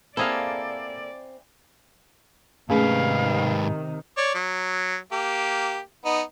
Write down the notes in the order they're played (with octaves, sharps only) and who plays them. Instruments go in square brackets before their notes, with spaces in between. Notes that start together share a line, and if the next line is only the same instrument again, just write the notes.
[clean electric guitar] A#3 A4 [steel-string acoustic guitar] C4 [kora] E4 G#4 F5 [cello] D5
[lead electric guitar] G#2 B4 [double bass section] C3 D#3 [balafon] A3 C#4 G#4 [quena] F5
[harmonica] C#5 D5
F#3
A#3 G4
B3 D#4